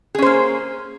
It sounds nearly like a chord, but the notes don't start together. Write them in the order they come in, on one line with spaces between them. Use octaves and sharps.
G#4 C#4 C5 A#3